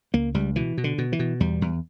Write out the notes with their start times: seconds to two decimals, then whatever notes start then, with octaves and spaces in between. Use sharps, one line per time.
0.14 C#2 A#3
0.34 C#2 G3
0.56 B2 E3
0.77 B2
0.84 D3
0.98 B2
1.12 E3
1.19 B2
1.40 E2 G3
1.61 E2